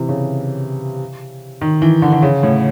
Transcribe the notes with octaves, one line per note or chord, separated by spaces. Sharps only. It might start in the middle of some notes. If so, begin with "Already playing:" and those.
Already playing: C3 E3
C#3
D#3
E3
D3
D3
C#3
A2